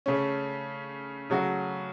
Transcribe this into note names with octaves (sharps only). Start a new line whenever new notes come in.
C#3 A3 C#4
C#3 F#3 A3 F#4